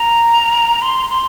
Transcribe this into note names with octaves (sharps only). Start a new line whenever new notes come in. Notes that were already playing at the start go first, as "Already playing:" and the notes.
Already playing: A#5
C6
C6